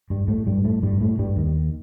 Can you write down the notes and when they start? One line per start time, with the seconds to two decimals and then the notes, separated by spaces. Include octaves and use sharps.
0.10 G2 G3
0.28 A2 A3
0.47 G2 G3
0.65 A2 A3
0.83 G2 G3
1.01 A2 A3
1.19 G2 G3
1.36 D#2 D#3